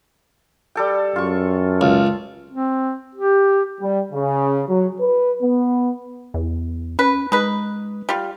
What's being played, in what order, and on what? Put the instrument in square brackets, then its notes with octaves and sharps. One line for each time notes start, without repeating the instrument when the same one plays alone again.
[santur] G3 A4 G5
[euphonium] F#2 [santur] F4 C#6
[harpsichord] C#2
[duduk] C4
G4
[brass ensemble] G3
C#3
F#3
B4
B3
[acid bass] E2
[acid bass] C#4 [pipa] B4
[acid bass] G#3 [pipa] D#4 B4
[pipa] G3 F4